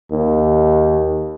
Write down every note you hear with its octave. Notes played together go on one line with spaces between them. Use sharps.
D#2